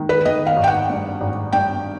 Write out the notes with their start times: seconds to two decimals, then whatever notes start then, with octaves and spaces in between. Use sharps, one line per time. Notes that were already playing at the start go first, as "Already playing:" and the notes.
Already playing: D#3 G#3
0.09 B4
0.25 D#3 D#5
0.47 F5
0.57 G#1
0.64 G5
0.68 F#5
0.89 G2
1.21 G#1
1.53 G2 G5